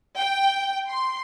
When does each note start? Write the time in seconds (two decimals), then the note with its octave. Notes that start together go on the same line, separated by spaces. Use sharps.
0.18 G5
0.88 C6